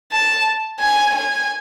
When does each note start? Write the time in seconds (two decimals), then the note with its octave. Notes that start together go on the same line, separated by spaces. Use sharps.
0.12 A5
0.80 G#5
1.15 G#5